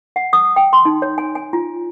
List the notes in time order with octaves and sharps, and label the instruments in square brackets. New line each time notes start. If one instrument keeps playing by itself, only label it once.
[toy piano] F#5
D#6
G5
C6
D#4
C#5
G#5
G#5
F4